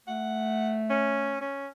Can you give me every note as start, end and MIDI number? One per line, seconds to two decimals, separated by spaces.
0.08 1.45 57
0.08 0.75 78
0.90 1.36 61
1.41 1.67 61